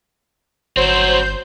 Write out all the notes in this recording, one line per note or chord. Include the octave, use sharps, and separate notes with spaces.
G1 F#3 C4 E4 C5 G6